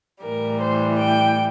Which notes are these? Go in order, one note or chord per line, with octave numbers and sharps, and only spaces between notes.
A2 E3 G3 A#4
C5
G5